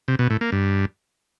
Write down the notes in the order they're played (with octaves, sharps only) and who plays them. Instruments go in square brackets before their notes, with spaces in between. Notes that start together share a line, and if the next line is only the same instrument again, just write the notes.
[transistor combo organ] C3
B2
A2
A#3
G2